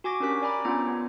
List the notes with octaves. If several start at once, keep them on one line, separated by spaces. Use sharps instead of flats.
F#4 G#5 C#6 D6 A#6
C#4 D4 G4 A#4 F#6 B6
D5 G#5 A#5 B5 D6
B3 C#4 D4 F4 A#5
B3